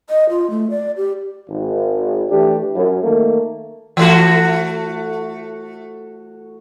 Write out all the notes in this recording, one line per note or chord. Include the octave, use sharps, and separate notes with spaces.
D#5
F4
A3
D5
G4
G#1
E3 A3 D4 G4
F#2
D#3 A3 A#3
E3 A3 F#4